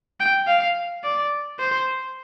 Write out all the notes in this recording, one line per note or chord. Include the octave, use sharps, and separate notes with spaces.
G5
F5
D5
C5